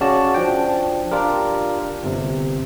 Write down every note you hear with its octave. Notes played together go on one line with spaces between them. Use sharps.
C#3 C#4 F#4 D5 A5
F3 D4 G5
D4 F4 G4 A#4
G1 C3